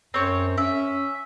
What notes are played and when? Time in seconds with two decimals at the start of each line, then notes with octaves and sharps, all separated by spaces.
0.14 F#2 C4 C#5
0.58 C#4 E5